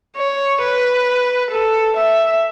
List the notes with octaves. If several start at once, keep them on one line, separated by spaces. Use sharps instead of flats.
C#5
B4
A4
E5